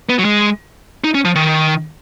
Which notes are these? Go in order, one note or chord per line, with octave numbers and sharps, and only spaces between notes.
B3
F#3
G#3
D#4
C#4
F3
D#3